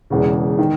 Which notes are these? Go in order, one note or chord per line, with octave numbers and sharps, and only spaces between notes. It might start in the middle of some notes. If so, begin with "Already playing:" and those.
E1 E2 C#3
D#3